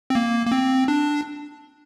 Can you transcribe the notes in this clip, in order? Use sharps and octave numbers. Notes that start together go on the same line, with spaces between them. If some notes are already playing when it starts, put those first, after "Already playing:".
C4
A#3
A#3
C4
D4